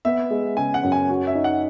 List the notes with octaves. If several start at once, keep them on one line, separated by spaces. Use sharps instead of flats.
B3 E5
G#3
C#3 G#5
F#5
F#2
G#5
F#4
E5
D#4
F#5